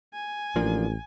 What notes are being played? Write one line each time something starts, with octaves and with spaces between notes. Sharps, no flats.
G#5
A1 F3 A#3 D4